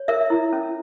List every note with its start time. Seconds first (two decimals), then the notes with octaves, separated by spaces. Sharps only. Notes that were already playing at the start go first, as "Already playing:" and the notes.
Already playing: C#5
0.08 A#4 E5
0.30 E4
0.53 C#4